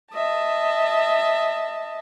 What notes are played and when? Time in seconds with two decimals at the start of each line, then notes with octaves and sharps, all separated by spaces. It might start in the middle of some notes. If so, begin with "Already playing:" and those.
0.14 D#5 E5 A5